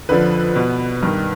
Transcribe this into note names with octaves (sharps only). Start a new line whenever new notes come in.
F2 D3 F3 B4
B2
G2 D#3